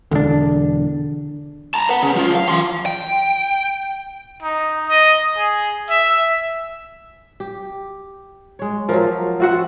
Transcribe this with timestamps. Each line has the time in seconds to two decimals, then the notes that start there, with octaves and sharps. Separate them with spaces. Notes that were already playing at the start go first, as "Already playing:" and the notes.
0.11 E1 D3 D4
1.74 A5 A#5
1.89 B4 F#5
2.03 C#3
2.15 F#3 F4
2.35 F5
2.49 E3 C6
2.86 G5
4.42 D#4
4.87 D#5
5.37 G#4
5.90 E5
7.40 G4
8.59 G#3 C#5
8.89 F3 F#3 F4 A#4
9.40 C4 F4 F#4 C5 E5 F#5